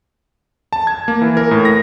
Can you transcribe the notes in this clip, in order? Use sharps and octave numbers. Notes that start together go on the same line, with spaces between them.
A5
G#6
A#3
E3
A#4
A2
A#6